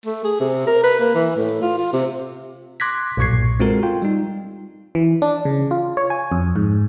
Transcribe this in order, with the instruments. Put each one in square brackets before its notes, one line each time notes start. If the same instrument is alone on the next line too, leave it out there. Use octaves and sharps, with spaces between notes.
[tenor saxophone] A3
G#4
C3
A#4
B4
A#3
E3
A2
F4
F4
C3
[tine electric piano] C6 D6 F#6 G#6 A#6 B6
B1 G2 A#2 C#6 G#6 C7
G#3 C4 F4 F#4 A4 A#4
F4 G5
G3 D#4
[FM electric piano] E3
D4
C#3
F4
C#5
G#5
F2
G#2